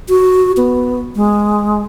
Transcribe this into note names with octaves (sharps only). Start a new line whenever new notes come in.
F#4
B3
G#3